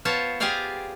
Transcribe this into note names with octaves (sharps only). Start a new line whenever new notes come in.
B3 F4 C5 C#5 A5
F4 G4 G#4 D5 F5 G5